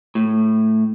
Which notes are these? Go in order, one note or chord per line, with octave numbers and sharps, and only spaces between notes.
A2